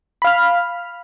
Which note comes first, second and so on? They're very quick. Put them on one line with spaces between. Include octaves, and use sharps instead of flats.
B5 F5 F6